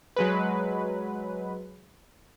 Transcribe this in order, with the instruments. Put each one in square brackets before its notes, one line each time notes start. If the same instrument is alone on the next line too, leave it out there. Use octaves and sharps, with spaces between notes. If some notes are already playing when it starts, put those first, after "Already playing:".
[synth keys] F#3 G#3 B4